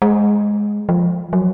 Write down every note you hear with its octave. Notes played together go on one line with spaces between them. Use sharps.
G#3
F3
F#3